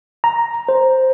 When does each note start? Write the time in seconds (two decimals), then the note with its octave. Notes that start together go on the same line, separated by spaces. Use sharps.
0.24 A#5
0.69 C5